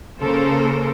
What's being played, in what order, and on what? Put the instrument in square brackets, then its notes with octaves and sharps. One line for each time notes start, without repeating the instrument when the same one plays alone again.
[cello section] C#3 A#3 A4 A#4 C5